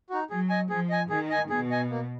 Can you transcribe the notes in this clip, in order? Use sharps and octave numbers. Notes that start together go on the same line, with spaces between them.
D#4 F#4
F#3 G#4
D#5 G#5
F3 G#4
D#5 G#5
D#3 G#4
D#5 G#5
B2 G#4
D#5 G#5
A#3